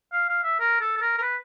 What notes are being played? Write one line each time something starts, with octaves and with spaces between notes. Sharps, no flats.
F5
F5
E5
A#4
A4
A4
A#4
A#4
B4